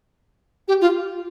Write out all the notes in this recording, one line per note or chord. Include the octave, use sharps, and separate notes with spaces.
G4
F4